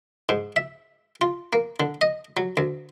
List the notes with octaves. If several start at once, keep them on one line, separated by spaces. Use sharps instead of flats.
G#2
E5
F4
A#3
D3
D#5
F#3
D2